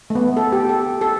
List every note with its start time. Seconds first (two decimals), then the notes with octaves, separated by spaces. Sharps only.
0.10 A3
0.15 B3
0.37 A4
0.52 G4
0.69 A4
1.01 A4